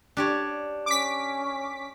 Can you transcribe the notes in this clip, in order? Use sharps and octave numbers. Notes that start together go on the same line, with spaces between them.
D4 G4 C#5
C#4 D6 B6